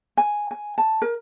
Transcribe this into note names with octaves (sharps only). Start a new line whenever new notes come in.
G#5
G#5
A5
A#4